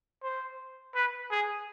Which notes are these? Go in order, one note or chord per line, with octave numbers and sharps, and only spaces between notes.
C5
B4
G#4